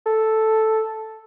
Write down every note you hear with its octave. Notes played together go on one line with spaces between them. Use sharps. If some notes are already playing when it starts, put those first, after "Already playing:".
A4